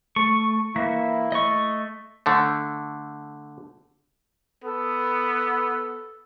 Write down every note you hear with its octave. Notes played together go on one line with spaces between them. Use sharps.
A3 C#6
E3 A#3 E4 E5
A3 D#5 C#6
D3 A3
B3 A4